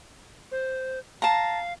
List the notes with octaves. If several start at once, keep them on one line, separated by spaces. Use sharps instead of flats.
C5
F5 A5 A#5